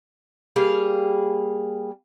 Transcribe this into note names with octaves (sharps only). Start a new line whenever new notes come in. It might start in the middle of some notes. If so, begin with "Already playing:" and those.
G3 A#3 G#4 F5